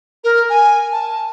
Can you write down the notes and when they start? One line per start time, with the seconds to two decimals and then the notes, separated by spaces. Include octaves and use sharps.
0.24 A#4
0.49 G#5
0.92 A5